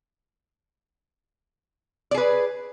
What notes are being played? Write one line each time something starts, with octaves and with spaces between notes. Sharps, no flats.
G#4 B4 D5